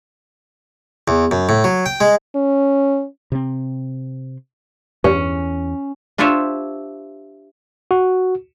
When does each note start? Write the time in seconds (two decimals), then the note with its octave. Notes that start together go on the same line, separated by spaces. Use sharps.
1.08 E2
1.31 F#2
1.49 A2
1.64 F#3
1.86 G5
2.01 G#3
2.35 C#4
3.32 C3 C4
5.04 E2 G2 C#4
6.18 D4 F4 G4 C5 C#5 E5
7.91 F#4